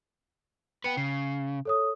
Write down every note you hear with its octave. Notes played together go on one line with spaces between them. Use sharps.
B3 B4 G5 C#7
C#3 C7
A4 C#5 D#6